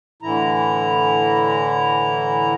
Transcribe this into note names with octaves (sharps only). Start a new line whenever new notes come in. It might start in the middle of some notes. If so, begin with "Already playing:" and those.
A2 D3 E3 E4 A#5